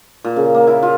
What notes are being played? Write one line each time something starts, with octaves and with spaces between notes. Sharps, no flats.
A#2
C#3
A#3
E4
F4